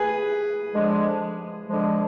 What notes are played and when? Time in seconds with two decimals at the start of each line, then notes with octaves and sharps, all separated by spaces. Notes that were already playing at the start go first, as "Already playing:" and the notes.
Already playing: G#4 B4
0.74 D3 F3 G#3
1.69 D3 F3 G#3